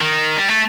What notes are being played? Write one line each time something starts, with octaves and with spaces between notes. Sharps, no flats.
D#3
G3
A3